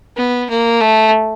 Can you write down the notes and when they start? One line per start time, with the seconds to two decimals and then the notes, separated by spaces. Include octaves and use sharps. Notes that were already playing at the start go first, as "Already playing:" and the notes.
0.16 B3
0.50 A#3
0.81 A3